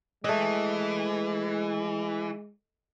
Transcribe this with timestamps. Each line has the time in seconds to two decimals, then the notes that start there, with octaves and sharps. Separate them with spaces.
0.24 E3 G#3 A3 D#5